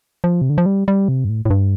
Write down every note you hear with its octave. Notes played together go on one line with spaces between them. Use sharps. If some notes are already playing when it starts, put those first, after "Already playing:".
F3
C3
D3
F3
G3
G3
C3
G2
A2
A2
G2